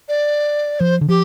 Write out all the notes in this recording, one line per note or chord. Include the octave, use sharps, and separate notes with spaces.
D5
F3 C5
D3
F3 G4